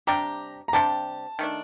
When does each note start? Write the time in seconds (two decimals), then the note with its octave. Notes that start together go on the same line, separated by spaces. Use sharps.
0.07 C3 G3 D4 G4 A#5
0.68 A#5
0.73 C3 G3 D4 G4 A5
1.39 D#3 A3 D4